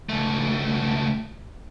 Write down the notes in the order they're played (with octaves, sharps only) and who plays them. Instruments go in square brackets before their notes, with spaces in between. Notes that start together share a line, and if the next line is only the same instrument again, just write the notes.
[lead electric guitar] C#2 A3